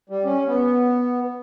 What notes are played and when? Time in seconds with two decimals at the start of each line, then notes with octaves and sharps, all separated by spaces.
0.09 G3
0.25 C#4
0.47 B3